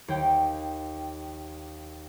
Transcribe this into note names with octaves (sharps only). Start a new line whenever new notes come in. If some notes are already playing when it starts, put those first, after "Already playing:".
D#2 G5